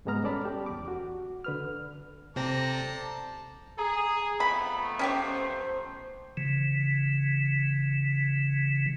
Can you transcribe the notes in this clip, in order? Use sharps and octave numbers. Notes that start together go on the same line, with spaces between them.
G#2 G3 G#3 B3 A#5 F6
C#4 A4 D5 A5 B5
G4
E2 D6
F#4
D3 B4 F6
C3 C4 A4 D5 A#5 A#6
G#4 A#5
F2 A3 B3 B5
C#4 G4 C5 C#6
C#3 E3